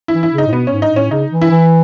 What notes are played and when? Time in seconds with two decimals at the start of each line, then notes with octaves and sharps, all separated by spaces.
0.08 E3 E4
0.23 E4
0.32 C#3
0.38 D#4
0.47 A2
0.52 B2 B3
0.67 G#2 C#4
0.82 D#4
0.92 A2 C#4
1.11 C#3 D#4
1.32 E3
1.41 E4
1.50 E3